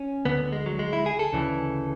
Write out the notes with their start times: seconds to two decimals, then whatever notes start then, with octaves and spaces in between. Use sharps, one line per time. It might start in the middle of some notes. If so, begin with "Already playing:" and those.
Already playing: C#4
0.25 D2 D3 B3
0.53 G#3
0.66 F#3
0.79 G#3
0.93 E4
1.06 G#4
1.19 A4
1.33 D2 C#3 E3